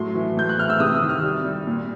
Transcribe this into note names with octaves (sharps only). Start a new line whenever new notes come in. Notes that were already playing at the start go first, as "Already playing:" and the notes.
Already playing: A2 F#3 C6
E3
A2 G6
F#6
E3 F6
E6
C3 D#6
E6
D#3
F6
G3
G3
A#2